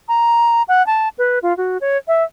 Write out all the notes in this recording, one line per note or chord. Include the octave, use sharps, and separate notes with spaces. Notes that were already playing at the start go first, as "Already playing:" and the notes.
A#5
F#5
A5
B4
F4
F#4
C#5
E5